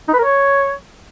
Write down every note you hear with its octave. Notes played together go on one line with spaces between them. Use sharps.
D#4
B4
A#4
C#5